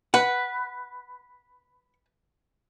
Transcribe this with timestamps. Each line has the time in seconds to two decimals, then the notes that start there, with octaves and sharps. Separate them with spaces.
0.14 B4 F#5